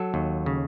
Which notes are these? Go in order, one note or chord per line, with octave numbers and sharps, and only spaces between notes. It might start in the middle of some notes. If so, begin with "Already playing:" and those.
Already playing: F#3 A4
D#2
C#3